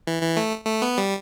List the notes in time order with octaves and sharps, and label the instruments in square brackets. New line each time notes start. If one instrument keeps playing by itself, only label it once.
[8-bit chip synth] E3
E3
A3
A3
B3
G3